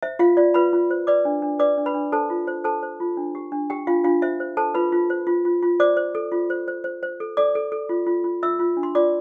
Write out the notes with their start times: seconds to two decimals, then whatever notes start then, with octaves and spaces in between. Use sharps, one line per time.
0.03 C5 E5
0.19 F4 F5
0.37 F4 D5
0.54 F4 B4 B5
0.73 F4
0.91 C5
1.07 B4 D5 D6
1.25 D4
1.42 D4
1.59 B4 D5 D6
1.78 D4
1.86 B4 B5
1.94 D4
2.12 A4 C5 A5
2.30 F4
2.47 C5
2.64 A4 C5 A5
2.83 C5
3.00 F4
3.17 D4
3.35 G4
3.52 D4
3.70 G4 G5
3.87 D4 F4 F5
4.04 D4 F4 F5
4.22 C5 E5
4.40 C5
4.57 A4 C5 A5
4.74 F4 B4 B5
4.92 F4
5.10 C5
5.27 F4
5.45 F4
5.63 F4
5.80 C5 D5 D6
5.97 C5
6.15 A4
6.32 F4
6.50 C5
6.68 C5
6.84 C5
7.03 C5
7.20 A4
7.37 A4 D5 D6
7.55 A4
7.72 A4
7.89 F4
8.07 F4
8.24 F4
8.42 F4 E5 E6
8.59 F4
8.77 D4
8.83 C6
8.95 F4 D5 D6